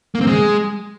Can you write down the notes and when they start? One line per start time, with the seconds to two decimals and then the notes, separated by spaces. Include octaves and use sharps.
0.15 A#3
0.21 C4
0.27 G#3